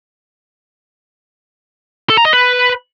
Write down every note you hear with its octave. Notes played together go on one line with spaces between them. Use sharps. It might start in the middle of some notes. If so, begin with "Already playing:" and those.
A4
A#5
D#5
B4